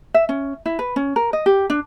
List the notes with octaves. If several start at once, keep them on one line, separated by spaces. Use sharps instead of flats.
E5
C#4
E4
B4
C#4
A#4
D#5
G4
D4